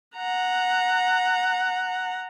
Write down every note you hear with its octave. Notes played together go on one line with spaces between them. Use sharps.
F#5 A#5